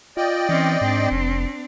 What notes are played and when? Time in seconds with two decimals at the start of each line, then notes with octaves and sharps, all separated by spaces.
0.17 F4 D5 D#5 G5
0.49 E3 C4 C#4
0.81 G#2 C4 D4
1.11 F1